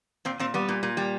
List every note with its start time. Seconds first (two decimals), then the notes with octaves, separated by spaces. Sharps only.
0.25 A#2 C4
0.39 A#2 C4
0.54 G3 B3
0.69 A#2
0.83 A#2
0.97 G3